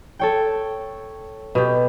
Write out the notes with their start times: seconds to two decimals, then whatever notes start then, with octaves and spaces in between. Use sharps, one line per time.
0.19 A4 C#5 G5
1.55 B2 G4